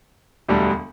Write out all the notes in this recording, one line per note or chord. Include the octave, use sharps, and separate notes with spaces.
E1 D2 D3 G3 D4